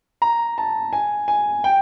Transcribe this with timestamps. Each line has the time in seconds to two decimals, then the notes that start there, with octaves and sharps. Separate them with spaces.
0.22 A#5
0.58 A5
0.93 G#5
1.28 G#5
1.64 G5